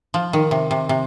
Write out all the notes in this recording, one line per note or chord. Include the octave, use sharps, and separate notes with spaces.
F3
D#3
C3
C3
C3